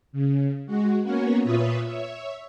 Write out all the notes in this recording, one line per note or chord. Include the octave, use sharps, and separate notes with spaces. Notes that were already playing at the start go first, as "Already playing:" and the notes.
C#3
G#3 F#4
A#3 B3 C#4 F#4 A#4 C#5
A#2 F4 B4 C#5 E5 D#6
C#5 E5